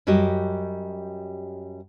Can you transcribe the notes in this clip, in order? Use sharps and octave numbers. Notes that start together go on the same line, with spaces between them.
F#2 G3 F#4 G4 D#5